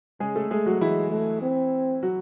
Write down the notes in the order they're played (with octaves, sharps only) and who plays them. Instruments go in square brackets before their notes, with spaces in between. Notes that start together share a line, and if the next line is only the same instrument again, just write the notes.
[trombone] C#3 [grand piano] G#3 G#4
[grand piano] A3 A4
[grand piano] G#3 G#4 [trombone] A3
[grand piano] F#3 F#4
[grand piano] E3 E4 [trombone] G#3
[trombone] A3
C4
[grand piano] F#3 F#4